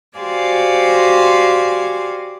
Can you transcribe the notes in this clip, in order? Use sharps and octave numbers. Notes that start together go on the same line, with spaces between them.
F#4 G4 C5 D5 F5 G#5